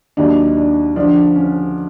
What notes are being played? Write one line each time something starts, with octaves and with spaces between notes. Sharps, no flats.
D#2 D#3 F#3 D4
D4
D2 D3 F3 D4
C#4